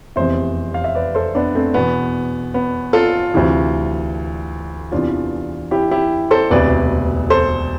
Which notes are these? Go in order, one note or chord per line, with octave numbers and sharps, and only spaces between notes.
F1 E2 C3 C5 E5
F5
E5
B4 D5
A4 C5
B3 D4
A3 C4
E2 B2 B3
B3
F4 A4
D2 C3 E3
E2 C3 E3 D4 F4
E4 G4
E4 G4
A4 C5
E1 D2 C3 B4 D5
A4 C5